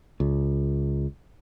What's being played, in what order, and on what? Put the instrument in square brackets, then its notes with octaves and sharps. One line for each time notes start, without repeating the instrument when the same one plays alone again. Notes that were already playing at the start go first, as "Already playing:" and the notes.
[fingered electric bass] C#2